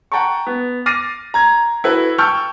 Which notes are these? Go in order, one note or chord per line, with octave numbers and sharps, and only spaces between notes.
F#5 G5 A5 A#5 C#6
B3
D6 F6 A6 A#6 C7 D#7
A#5 G#6
E4 F#4 A4 B4
G5 A5 C#6 E6 F6 G6